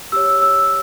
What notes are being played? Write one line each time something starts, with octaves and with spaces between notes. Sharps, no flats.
G4 C#5 E6
E6